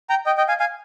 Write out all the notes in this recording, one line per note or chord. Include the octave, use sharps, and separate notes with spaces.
G5 A#5
D#5 G5
D#5 G5
F5 G#5
F5 G#5